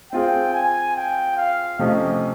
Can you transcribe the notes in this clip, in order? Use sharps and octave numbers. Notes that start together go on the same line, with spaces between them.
C4 F4 G#4 G5
G#5
G5
F5
C3 F3 A3 C#4 D#5